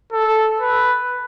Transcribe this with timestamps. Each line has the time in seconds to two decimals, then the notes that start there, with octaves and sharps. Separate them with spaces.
0.13 A4
0.60 B4